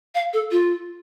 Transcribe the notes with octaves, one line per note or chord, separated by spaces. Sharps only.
F5
A4
F4